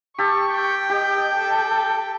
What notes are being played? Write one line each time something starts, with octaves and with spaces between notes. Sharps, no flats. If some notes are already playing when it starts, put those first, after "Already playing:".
G4 A4 C#6
G5
G4 D#5
A4